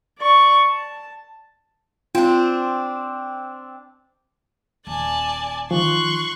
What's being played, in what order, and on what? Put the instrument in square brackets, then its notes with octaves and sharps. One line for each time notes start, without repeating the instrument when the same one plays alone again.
[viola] D5 C#6
A5
[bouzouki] C4 D4 [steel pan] F4
[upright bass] D#1 [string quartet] D5 G#5 A5
[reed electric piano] D#3 F3 [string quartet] C6 C#6 F#6